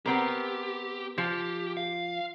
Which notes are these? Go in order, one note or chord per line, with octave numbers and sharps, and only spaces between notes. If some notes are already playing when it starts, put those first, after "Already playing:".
B3 C4 G4 A#4
F3 G4
F5